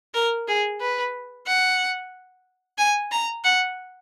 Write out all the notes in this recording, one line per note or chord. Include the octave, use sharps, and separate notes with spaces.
A#4
G#4
B4
F#5
G#5
A#5
F#5